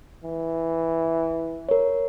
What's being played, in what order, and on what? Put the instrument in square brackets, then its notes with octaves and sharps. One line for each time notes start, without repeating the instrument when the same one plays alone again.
[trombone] E3
[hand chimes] A#4 C#5